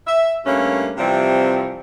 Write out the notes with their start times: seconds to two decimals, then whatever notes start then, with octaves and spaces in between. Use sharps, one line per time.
0.07 E5
0.46 G2 A3 A#3 C#4
0.98 C3 E3 F3 G3 C4